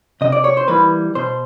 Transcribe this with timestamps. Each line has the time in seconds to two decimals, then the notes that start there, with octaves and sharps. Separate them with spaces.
0.21 C3 D#5
0.32 D5
0.44 C#5
0.57 C5
0.68 E3 G3 A#3 B4
1.15 B2 C5